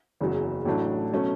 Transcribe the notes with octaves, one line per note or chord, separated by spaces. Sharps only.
F#1 E2 C#3 F#3
A1 A2 F#3 A3 D4
B2 F#3 A3 C#4